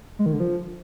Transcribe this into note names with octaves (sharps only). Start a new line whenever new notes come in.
G#3
D#3
D3
F3